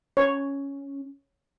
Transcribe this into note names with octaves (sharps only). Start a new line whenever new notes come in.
C#4 C#5